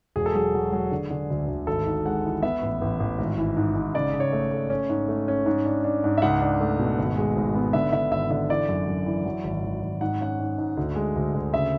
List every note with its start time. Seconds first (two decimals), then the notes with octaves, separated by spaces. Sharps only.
0.16 E1 G#4
0.26 A4
0.34 F#3 G#4
0.54 F#3
0.72 F#3
0.91 D3
1.10 D3
1.30 D2
1.48 D2
1.67 G#1 A4
1.86 G#2
2.06 G#3 F#5
2.25 E3
2.42 B3 E5
2.63 A1
2.81 A1
3.00 A1
3.18 G#1
3.38 E3
3.57 G#2
3.75 G#2
3.94 C#3 D5
4.14 C#3
4.20 C#5
4.32 A3
4.51 A3
4.70 C#4
4.89 G#2
5.09 A3
5.28 C#4
5.46 G#2
5.66 D4
5.84 D4
6.04 G#2
6.18 E5
6.22 C#2 F#5
6.41 D4
6.61 A3
6.79 B2
6.98 G#1
7.17 G#3
7.36 G#1
7.55 B3
7.73 D3 E5
7.92 D3 E5
8.11 G#1 E5
8.30 D3 E5
8.50 E3 D5
8.69 F#2
8.88 F#2
9.06 E3
9.25 F#3
9.44 G#1
9.64 G#1
9.82 G#1
10.01 G#2 F#5
10.20 C#4 F#5
10.40 G#2
10.58 G#2
10.77 D2
10.96 G#3
11.16 D2
11.34 D2
11.53 C#3 E5